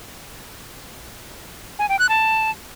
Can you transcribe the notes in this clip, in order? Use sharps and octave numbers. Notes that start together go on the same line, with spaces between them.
G#5
G5
F#6
A5